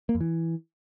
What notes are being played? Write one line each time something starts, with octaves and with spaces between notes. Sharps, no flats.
A#3
F2
E3